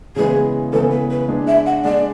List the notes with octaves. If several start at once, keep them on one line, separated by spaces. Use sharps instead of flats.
C#3 E3 G#3 B3 G#4
C#3 E3 G#3 B3 A4
B4
B4
G#3 D4 G#4
E5
F#5
G#3 D4 G#4 D5